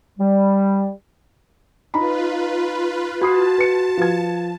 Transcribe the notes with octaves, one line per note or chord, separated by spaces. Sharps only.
G3
D#4 F4 B4 A#5 B5
F#4 A5 B5 D#6 C7
B4 C#7
F3 B4 G#6